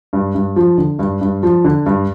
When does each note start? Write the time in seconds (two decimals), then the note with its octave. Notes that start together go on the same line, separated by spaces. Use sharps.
0.13 G2
0.35 G2
0.56 F3
0.78 D3
0.99 G2
1.21 G2
1.43 F3
1.64 D3
1.86 G2